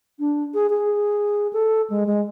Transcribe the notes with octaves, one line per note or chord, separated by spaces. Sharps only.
D4
G#4
G#4
A4
G#3
G#3